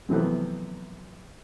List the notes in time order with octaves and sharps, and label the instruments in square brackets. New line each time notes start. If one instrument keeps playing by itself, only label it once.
[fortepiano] F#2 C3 E3 F3 A3 B3